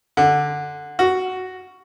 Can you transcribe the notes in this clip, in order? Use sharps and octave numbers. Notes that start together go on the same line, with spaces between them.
D3
F#4